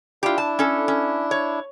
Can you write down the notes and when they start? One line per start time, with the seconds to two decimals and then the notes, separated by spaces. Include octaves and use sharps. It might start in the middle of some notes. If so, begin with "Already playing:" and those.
0.23 D4 E4 F4 G4
0.38 A5
0.59 C#4 A4
0.88 C#4
1.31 C#5